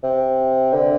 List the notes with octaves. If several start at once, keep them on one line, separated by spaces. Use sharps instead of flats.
C3
D3